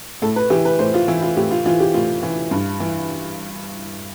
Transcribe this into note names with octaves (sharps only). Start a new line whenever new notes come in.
A2 A4
B4
E3 G4
B4
A2 C5
F4
E3 E4
F4
A2 G4
F4
E3 F4
G4
A2 F4
E3
G2
E3